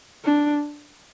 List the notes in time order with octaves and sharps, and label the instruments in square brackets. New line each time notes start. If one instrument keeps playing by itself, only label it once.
[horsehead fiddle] D4